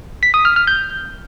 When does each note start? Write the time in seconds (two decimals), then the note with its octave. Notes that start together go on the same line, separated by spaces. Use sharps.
0.23 B6
0.34 D#6
0.45 F6
0.56 F6
0.67 G6